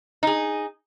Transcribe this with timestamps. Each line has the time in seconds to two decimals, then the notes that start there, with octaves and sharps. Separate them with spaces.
0.23 D#4 G#4